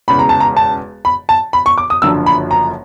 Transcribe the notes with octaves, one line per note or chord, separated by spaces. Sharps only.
E1 E2 C#3 B5
A#5
A5
A#5
A5
B5
A5
B5
C#6
D6
D#6
F#1 F#2 D3 F3 E6
B5
A#5